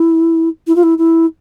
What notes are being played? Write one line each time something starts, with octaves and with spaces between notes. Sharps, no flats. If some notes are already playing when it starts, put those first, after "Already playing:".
Already playing: E4
E4
F4
E4
E4